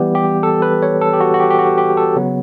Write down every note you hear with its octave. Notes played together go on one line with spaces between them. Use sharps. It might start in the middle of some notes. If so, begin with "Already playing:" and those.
Already playing: E3 G3 B3 G4
G4
A4
B4
C#5
A4
G4
F#4
F#4
G4
G4
F#4
G4
A4
C#3 F#3 B3